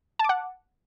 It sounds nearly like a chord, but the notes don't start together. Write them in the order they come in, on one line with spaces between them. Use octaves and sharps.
A5 D6 F#5